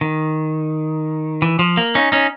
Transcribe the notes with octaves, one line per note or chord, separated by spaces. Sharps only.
D#3
E3
F3
A#3
C#4 D#4
C#4 D#4